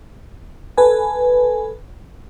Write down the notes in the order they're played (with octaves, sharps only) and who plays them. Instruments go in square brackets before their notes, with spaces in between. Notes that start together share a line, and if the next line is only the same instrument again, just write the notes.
[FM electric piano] A4 B4 G#5